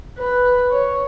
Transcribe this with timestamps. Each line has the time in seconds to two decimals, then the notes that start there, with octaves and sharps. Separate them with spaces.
0.18 B4
0.71 C#5